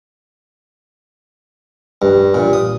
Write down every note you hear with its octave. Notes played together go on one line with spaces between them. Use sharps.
G2
A#2
D#6